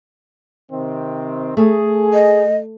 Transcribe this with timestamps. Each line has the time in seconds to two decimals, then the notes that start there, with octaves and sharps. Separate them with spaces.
0.71 C3 D#3 C4
1.57 A3 G#4
2.14 D#5